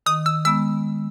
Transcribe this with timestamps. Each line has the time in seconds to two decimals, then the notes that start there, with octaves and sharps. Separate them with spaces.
0.06 D#3 D#6
0.26 E6
0.45 G#3 B3 E6